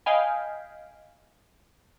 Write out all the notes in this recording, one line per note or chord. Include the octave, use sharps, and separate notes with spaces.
D#5 F5 G5 G#5 B5